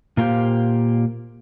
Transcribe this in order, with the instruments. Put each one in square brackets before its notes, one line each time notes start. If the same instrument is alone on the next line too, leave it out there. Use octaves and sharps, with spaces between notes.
[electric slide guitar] A#2 A#3 F4 G4 C5